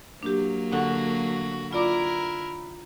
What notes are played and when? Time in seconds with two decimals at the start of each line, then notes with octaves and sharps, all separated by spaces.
0.23 F#3 A#3 D4 G4
0.72 D3 F#4
1.73 E4 F4 A#4 D5 D6